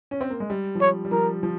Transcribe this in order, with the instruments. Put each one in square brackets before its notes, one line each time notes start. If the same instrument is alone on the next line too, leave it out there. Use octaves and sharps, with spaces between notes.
[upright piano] C#4
C4
A#3
G#3
G3
F3
[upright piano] G3 [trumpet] C#5
[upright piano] G3
[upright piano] F3 [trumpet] A#4
[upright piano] F3